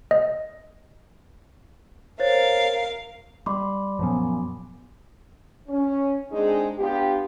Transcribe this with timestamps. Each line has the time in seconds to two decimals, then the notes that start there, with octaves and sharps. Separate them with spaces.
0.11 D#5
2.20 A#4 C5 C#5 F5 A6
3.46 G3 B5 C6 D6
3.99 F#2 A#2 F3 F#3 B3 C#4
5.68 C#4
6.31 G#3 C4 D4 D#4 G#4
6.78 B3 D4 F4 G4